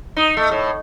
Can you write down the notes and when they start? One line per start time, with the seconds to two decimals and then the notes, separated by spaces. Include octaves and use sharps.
0.17 D#4
0.37 A3
0.51 A2